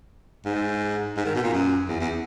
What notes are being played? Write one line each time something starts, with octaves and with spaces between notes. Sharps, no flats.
G#2
G#2
D#3
B2
A#2
F#2
E2
E2